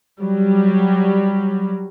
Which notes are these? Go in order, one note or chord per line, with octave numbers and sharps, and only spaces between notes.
F#3 G3